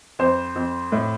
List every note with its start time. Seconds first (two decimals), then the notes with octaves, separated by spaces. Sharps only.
0.19 F2 C5
0.56 F2
0.92 A2